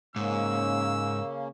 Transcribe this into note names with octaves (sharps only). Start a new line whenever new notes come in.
G#2 C#3 A#3 C#4 E6